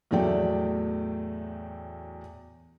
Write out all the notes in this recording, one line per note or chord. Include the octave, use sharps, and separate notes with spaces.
E2 A2 F#3 A3 D5 G5